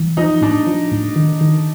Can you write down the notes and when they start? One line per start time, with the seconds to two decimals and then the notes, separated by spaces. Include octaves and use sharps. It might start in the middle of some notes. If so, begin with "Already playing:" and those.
Already playing: E3
0.17 F3 D#4
0.41 A2 D4
0.67 F3
0.92 A2
1.16 D#3
1.41 D#3